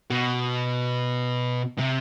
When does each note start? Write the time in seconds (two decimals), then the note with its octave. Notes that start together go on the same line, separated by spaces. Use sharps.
0.10 B2
1.78 C3